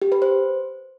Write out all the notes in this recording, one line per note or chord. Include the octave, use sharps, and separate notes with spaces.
G4
B4
C5